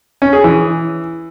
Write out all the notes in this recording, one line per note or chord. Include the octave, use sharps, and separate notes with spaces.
C#4
G#4
E3